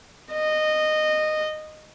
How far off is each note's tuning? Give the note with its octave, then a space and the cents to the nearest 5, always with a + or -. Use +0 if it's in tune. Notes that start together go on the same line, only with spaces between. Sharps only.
D#5 -15